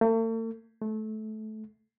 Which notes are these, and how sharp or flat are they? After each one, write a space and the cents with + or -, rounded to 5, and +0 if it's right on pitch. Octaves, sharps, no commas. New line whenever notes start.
A3 +45
A3 -20